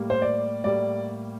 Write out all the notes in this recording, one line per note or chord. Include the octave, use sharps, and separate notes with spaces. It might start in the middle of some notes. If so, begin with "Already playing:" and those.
Already playing: A2 G3 A#3
C5
D5
A2 G3 A#3 D5